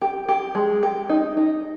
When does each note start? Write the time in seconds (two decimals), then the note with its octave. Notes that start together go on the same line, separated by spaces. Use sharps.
0.02 G4
0.29 G4
0.55 G#3
0.83 G4
1.09 D#4
1.37 D#4